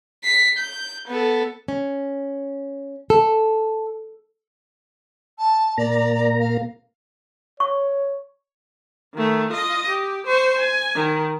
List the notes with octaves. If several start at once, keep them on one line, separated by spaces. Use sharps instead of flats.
B6 C7
G6
B3 A4
C#4
A4
A5
A#2 A#3 D5 A#5
F5
C#5 C#6
D#3 A3
F4 D#5
G4
C5 C#6
G#5
D#3